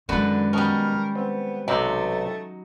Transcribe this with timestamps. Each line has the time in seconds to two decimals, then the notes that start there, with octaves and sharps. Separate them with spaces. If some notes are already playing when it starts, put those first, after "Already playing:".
0.09 F#2 D3 D#3 G#3 F#4 B4
0.53 B2 G3 B3 C#4 A#4
1.15 B3 C4
1.68 B1 C3 F#3 A3 D#4 B5